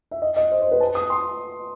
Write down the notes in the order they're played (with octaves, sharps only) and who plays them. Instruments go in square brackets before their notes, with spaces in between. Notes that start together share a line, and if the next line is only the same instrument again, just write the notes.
[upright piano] E5
D#5
D#5
C5
C5
B4
A5
D#6
C6